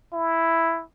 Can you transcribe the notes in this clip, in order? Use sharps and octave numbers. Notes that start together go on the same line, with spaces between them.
E4